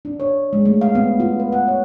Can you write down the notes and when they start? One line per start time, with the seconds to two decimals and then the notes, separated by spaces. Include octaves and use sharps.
0.05 D4
0.20 C#5
0.53 G#3
0.65 A3
0.81 F5
0.95 B3
1.20 F4
1.40 B4
1.52 F#5
1.68 C#5